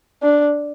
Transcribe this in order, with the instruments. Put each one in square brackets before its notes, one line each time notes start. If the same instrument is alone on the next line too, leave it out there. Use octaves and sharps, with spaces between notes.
[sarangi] D4